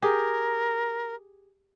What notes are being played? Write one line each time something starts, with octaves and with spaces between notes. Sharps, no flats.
G4 G#4 A#4